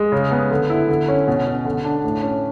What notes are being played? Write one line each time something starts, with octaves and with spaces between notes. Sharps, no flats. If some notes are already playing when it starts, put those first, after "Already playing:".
Already playing: G#3
C#3
B3
D3
E4
D3
C#4
B2
C#4
D3
D4
A2
C#4